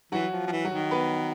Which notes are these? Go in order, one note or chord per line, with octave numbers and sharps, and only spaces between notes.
E3 F#3 F#4
F3
F3
E3
F#3 F#4
D#3
B3 B4